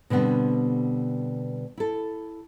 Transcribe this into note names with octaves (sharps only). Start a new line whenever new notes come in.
B2 D3 G3 B3 C4
E4 A4